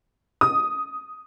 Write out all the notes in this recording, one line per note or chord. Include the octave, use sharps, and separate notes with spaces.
D#6